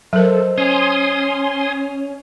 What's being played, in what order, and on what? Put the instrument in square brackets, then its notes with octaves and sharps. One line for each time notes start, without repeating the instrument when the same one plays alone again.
[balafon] F#3 A#4 [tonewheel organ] A4 [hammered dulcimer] C5 D#5
[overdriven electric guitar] C#4 [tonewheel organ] G#5 C6 D#6